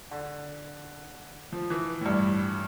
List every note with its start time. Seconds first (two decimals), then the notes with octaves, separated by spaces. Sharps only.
0.11 D3
1.52 F3
1.70 E3
2.01 A2
2.06 G2